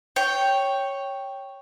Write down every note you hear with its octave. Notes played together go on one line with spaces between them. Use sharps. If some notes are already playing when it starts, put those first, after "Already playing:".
C#5 G5